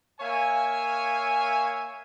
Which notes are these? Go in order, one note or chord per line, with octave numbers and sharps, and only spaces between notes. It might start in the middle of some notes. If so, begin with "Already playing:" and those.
A#3 C#5 E5 F5 G#5